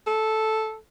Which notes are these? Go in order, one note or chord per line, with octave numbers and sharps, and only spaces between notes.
A4